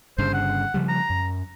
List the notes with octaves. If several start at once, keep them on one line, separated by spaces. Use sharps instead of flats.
G1 G2 C#3 C5
F#5
C#3 F3 G3
A#5
F#2